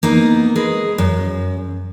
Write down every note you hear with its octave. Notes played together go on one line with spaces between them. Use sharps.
A#3 B3 D#4
G#3 G#4 A#4 B4
F#2